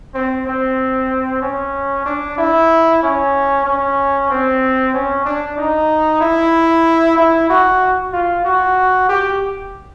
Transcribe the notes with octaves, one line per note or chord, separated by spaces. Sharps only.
C4
C4
C#4
D4
E4
C#4
C#4
C4
C#4
D4
D#4
E4
E4
F#4
F4
F#4
G4